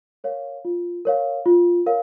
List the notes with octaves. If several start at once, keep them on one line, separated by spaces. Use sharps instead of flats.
A#4 C#5 F5
F4
A#4 C#5 F5
F4
A#4 C#5 F5